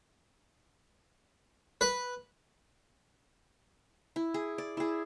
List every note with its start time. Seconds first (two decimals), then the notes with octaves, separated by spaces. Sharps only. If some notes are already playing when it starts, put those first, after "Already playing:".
1.81 B4
4.16 E4
4.34 G#4
4.58 D5
4.77 E4 G#4